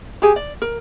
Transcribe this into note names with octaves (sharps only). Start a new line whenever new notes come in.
G4 G#4 G#5
D5
A#4